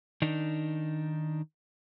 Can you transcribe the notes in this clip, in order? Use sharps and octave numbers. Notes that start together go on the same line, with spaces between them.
D#3 D4 D#4